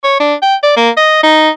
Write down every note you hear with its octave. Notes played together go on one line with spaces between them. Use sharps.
C#5
D4
G5
D5
A#3
D#5
D#4